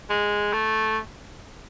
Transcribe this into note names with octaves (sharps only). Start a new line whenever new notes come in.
G#3
A3